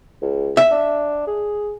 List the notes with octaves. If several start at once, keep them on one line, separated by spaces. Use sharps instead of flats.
C#2
E5
D4
G#4